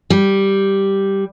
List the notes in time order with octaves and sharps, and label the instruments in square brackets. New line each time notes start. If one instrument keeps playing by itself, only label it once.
[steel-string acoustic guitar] G3